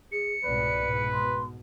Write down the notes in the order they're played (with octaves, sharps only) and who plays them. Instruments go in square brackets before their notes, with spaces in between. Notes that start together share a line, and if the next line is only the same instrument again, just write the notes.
[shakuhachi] G#4 [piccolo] C#7
[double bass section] C2 G#2 B2 [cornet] B4 [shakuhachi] D5
[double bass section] G#2 B2
[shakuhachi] C6